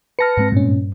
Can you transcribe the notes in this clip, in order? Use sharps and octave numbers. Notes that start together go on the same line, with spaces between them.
B4 A5 F6 A#6 C#7
G#2 G#3 C4
G2 A#2 C#4